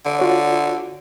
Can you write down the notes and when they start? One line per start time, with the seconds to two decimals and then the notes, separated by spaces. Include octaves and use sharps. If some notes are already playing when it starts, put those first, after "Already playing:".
0.05 D3
0.19 F4 F#4 C#5